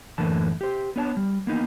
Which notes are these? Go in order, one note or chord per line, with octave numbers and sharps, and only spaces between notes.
F#2 A2 D3 E3 A#3 A5
G4 C5
B3 D4 C#5 G#5 A5
G3
A#3 B3 D#4